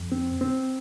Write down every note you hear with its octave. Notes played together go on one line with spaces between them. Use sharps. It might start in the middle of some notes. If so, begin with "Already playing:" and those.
Already playing: F2
C4
C4